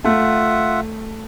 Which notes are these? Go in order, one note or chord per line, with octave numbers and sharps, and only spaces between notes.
A3 F4 E5 F#5